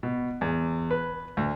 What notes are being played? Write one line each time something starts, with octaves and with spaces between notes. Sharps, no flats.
B2
E2
B4
D2